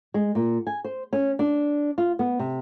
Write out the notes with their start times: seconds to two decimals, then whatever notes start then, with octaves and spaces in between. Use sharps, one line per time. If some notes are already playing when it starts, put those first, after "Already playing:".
0.14 G#3
0.35 A#2
0.67 G#5
0.84 C5
1.13 C#4
1.39 D4
1.98 F4
2.19 B3
2.39 C3